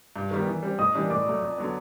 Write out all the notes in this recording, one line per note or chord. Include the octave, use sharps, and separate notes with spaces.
G2
D#3 G3 B3
E3
G3 C4
A2 D#5 D#6
E3 G3 A#3 D4
A2 D5 D6
F#3 A3
F2
D3 F#3 B3